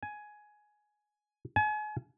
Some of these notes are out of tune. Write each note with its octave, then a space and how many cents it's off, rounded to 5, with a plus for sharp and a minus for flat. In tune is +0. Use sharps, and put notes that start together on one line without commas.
G#5 +10
G#5 +35